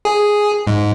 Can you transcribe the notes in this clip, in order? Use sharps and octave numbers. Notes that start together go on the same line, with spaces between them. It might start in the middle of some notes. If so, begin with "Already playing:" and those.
G#4
G#2